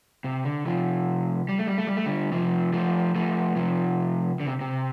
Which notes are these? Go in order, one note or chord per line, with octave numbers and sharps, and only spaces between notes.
C3
D3
C3 F3
G3
A3
G3
A3
G3
A3
D3 G3
C3 F3
F3 A3
F3 A3
C3 F3
D3
C3
C3